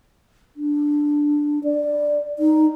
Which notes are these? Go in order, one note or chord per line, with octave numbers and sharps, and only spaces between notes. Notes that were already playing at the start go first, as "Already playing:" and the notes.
D4
D5
D#4